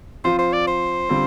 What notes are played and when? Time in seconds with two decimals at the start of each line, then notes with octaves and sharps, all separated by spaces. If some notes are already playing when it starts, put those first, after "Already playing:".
0.24 F3 C4 F4 C5
0.38 C5
0.53 D5
0.67 C5
1.09 D3 G3 C4 F4